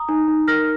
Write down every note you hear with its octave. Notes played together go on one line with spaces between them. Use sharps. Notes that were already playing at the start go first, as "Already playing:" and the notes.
Already playing: A#5 D#6
D#4
D#4
A#4 F6 A#6